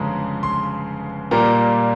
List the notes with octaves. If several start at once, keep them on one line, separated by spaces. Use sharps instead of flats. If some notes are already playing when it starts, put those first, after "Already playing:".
Already playing: G1 F2 C#3 G#3 A#5
C6
A#2 G3 A#3 A#5